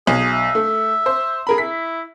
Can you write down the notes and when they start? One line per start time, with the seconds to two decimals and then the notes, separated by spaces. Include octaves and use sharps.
0.07 B1 G#4
0.33 E5
0.55 A3
1.06 C5
1.47 G#4 A#4 B5
1.58 E4 B6